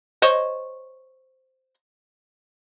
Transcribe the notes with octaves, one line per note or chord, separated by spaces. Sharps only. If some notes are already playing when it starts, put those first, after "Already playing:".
C5 C#5 D#5